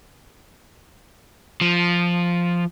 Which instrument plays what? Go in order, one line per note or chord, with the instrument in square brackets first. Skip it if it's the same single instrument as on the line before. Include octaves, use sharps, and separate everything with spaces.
[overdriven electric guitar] F3